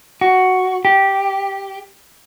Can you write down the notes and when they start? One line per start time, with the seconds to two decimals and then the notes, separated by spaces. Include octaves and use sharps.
0.21 F#4
0.85 G4